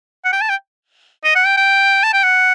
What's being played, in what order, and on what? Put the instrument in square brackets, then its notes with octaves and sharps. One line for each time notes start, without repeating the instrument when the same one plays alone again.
[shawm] F#5
G5
A5
G5
D#5
F#5
G5
G5
A5
G5
F#5